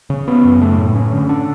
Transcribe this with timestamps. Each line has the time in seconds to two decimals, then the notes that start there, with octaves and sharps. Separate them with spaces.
0.10 C#3
0.28 B3
0.45 F#2
0.61 A3
0.78 A2
0.96 C#4
1.12 D3
1.29 D4